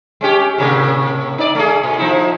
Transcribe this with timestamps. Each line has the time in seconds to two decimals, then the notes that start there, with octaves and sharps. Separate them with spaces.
0.21 G#3 C#4 G4
0.58 A2 C3 A#3
1.38 D#4 D5
1.55 A3 G#4
1.83 A#2
1.98 F3 D#4 E4